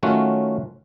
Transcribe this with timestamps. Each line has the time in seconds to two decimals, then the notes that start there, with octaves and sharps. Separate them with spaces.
0.03 D#3 F#3 A3 C#4 F4 F#4